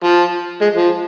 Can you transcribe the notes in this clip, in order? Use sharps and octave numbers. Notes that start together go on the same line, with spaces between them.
F3
G#3
F3